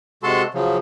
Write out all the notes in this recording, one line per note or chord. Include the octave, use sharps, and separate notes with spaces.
C3 G#3 F#4 A4 A5 C6
C#3 F3 F#3